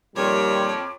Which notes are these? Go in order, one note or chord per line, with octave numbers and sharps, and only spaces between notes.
F2 A#2 D#3 G3 C#5 D6